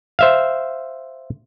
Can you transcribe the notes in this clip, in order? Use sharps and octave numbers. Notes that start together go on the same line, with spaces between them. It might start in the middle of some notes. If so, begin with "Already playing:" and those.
C5 E5 F5